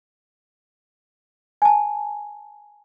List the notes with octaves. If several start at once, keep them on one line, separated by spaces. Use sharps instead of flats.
G#5 A5